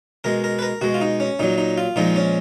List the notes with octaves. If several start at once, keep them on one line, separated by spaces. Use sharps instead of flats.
B2 G#3 A#4
A#4
B4
A#4
B2 G#3 F#4
F4
D#4
C#4
A#2 F#3 D#4
D#4
F4
A#2 F3 G#3 D#4
C#4